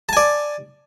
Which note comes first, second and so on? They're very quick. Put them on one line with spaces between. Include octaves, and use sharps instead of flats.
A5 G#5 D5